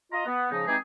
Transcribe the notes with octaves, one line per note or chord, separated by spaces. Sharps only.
F4 D#5 A#5
B3
C#3 F3 D#4
E3 G#3 C4 D#4 G4 G#4